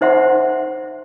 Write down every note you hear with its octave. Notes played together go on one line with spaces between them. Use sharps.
D#4 C5 E5 F#5 C6